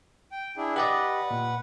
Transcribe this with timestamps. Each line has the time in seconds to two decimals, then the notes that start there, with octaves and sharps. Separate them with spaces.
0.32 G5
0.57 D4 E4 G#4
0.76 G4 B4 D5 D#5 F#5
1.31 A#2